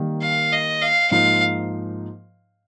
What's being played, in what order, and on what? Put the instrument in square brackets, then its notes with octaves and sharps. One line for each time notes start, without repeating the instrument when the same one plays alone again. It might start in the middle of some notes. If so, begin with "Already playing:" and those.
Already playing: [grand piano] D#3 G3 A#3
[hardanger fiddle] F5
D#5
F5
[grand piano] G#2 F3 A#3 D#4 [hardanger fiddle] F5